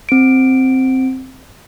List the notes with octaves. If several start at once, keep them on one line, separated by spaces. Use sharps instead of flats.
C4 D7